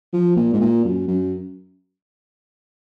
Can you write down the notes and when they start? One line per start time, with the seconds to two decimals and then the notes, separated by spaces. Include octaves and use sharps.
0.13 F3
0.36 A#2
0.53 G#2
0.61 A#2
0.84 F#2
1.08 F#2